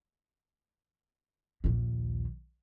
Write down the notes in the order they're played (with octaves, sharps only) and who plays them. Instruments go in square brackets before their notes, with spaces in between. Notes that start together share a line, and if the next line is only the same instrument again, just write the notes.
[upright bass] A#1 D#2